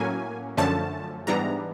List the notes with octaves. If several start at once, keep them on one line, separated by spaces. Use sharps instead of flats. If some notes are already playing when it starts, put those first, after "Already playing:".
Already playing: A2 F#3 A#3 C#4 G#5
F#2 D3 F3 A3 C#4 A5
G#2 E3 G3 B3 D4 A#5